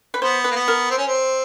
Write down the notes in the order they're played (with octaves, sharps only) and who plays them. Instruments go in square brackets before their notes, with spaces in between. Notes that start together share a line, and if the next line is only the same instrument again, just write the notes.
[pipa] B4
[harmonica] B3 [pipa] C5
[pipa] B4
[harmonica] A#3
B3
[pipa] A#4
[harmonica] C4
C#4
C4